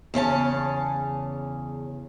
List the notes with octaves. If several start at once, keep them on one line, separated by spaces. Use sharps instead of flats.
E2 C#3 C#4 A5